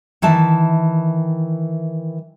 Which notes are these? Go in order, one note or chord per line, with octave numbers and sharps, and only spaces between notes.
D#3 E3 E4 E5 A5